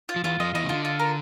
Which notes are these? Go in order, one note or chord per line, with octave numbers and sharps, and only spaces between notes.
F4
F3
E2 E3 F4
F2 F3 D#5
E2 E3 D#5
C#3
D3 F4
F4
A#4